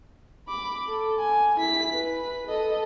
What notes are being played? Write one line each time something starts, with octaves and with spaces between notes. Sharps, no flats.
B5 D6
A4
G#5
E4 B6
B4
A4 D#5